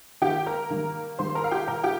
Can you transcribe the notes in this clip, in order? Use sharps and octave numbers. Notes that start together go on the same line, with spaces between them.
D#3 A#3 G4 G5
A#4 A#5
D#3 G3 A#3
D#3 G3 A#3 C5 C6
A#4 A#5
F5
G4 G5
A#2 A#3 A#4 A#5
G4 G5